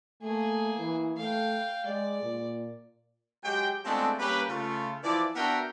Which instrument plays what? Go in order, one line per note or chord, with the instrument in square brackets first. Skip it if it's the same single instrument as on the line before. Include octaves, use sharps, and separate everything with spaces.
[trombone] A3 [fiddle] A#3 G#4
[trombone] E3
[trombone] A3 [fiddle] F5 G5
[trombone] G#3 [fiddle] D5
[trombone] A#2
[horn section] F#3 G#3 G4 G5
F3 G#3 A3 B3 C4 D4
G3 A#3 C#4 G4 B4
C#3 A3 F4
E3 F3 E4 D5
B3 D4 F#4 A#4 E5 G5